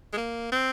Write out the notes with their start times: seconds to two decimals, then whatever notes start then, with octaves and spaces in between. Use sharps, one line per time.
0.13 G#3
0.17 A#3
0.52 C4